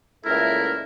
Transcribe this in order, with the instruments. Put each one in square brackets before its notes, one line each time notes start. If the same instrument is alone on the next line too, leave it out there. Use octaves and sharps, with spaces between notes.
[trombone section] C#2 A#2 A3 [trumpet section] E4 A#4